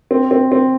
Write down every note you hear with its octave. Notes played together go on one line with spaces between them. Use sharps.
C4
C4
C4